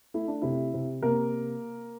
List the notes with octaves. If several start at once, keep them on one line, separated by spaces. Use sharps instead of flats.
A3 E4
D4
C3 E4
C3
C3 A#3 A#4